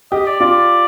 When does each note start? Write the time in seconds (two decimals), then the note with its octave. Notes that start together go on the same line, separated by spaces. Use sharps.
0.11 G4 D#5
0.26 D5
0.40 F4 D5